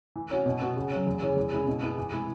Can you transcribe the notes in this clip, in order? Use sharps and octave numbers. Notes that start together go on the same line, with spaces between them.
E3
C#4 F#4
B2
B3 F#4
C#3
F#3 C#4
E2
C#3 E3 C#4 G#4
E2
C#3 G#3 E4 G#4
B2
B3 E4 G#4
E3
G#3 E4 G#4